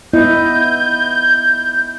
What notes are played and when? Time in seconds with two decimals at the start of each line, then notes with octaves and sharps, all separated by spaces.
0.13 B3 E4 D#5 G6